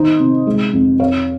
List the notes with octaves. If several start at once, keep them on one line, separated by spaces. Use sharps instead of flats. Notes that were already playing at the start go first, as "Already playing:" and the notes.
Already playing: D#3 D#4 C5 D#5
C3
G#3
F2
F2 C#5 F5